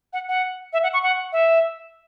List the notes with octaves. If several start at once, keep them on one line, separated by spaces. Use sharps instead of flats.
F#5
F#5
E5
F#5
C#6
F#5
E5